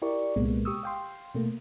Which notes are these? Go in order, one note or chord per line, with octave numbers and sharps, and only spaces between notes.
E4 G4 A#4 D5 C#6
C2 A#2 G#3 A#3 B3
G4 C#6 D#6 E6
F5 G5 C6
B2 A3 A#3